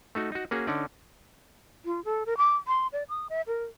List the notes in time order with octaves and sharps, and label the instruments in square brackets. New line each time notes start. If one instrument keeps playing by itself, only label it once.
[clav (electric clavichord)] A3 D#4 F#4
D#4 F#4
A#3 C#4 F#4 G#4
D3 C#4 D#4 D5
[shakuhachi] F4
A4
A#4
D6
C6
D5
D#6
E5
A#4